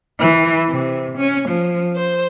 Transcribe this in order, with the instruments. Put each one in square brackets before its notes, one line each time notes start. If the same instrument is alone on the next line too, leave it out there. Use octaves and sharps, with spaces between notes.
[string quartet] E3
C3
C#4
F3
C5